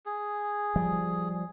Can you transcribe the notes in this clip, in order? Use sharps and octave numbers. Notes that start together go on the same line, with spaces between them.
G#4
F3 G3